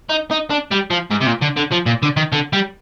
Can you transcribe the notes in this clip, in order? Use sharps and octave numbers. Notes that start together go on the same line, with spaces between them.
D#4
D#4
D4
G3
F3
G#2
C3
A#2
D3
D3
F3
A#2
D3
D#3
D3
G3